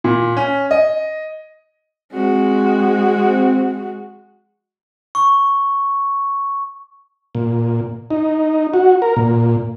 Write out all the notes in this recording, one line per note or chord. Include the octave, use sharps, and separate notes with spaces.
A#2
C#4
D#5
G#3 C4 F#4
C#6
A#2
D#4
F#4
A#4
A#2